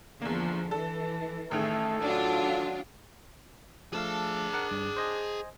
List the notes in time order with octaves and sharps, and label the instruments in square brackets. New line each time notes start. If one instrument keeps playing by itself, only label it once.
[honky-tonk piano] E2 A#3 [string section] D3 F3
[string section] E3 [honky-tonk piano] A4
[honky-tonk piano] A1 D#3 G#4 [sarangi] A3 [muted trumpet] A4
[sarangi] F#3 [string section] D4 F4
[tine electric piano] F3 A3 F5 [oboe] D4 [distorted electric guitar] G#4 A5
[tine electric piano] A#4 F#5
G2
C5 D#5 G#5